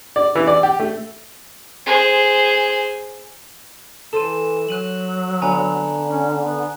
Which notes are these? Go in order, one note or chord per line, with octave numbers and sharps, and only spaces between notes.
D5
E3
D5
G4
A3
G#4 C5
E3 A4 C5 D#7 E7
F#3 F#6 D#7 F#7
D3 B3 G#5 A#5
C#4
B3